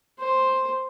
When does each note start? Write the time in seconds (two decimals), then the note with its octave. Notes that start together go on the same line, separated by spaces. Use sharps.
0.19 C5